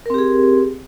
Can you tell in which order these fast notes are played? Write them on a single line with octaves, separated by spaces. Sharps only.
A#4 C4 G4 G#4